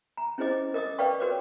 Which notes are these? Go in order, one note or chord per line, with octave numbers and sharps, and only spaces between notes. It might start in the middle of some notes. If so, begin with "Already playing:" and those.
A#5
C#4 E4 G#4 C5 D#5 D6
A#4 D#5 D6 D#6
B4 D5 F5 G5 C#6
F#4 A#4 B4 C#5 D6